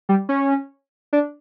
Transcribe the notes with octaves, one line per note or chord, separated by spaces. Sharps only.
G3
C#4
D4